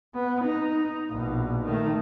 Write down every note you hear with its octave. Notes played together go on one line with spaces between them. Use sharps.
B3
D#4
A#1 B2
D#3 A3